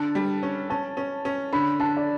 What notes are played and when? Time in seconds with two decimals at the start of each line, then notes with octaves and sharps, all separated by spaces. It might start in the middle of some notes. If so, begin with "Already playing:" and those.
Already playing: D3 A5
0.15 G3
0.43 C#4
0.70 C#4 A5
0.97 C#4
1.25 C#4
1.53 D3 B5
1.80 D3 A5
1.97 D5